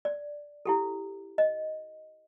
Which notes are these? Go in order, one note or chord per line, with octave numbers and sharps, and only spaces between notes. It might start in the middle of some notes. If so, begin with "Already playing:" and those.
D5
E4 G4 A4
D#5